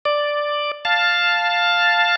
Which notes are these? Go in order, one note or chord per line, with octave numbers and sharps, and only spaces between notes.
D5
F5 A5